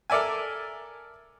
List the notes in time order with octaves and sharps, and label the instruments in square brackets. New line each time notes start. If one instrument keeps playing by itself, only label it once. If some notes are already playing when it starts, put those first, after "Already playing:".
[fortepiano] A4 A#4 D5 E5 G#5